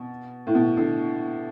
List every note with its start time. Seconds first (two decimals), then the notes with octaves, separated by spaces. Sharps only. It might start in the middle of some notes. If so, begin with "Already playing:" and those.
Already playing: B2
0.47 A2
0.55 B2
0.77 D3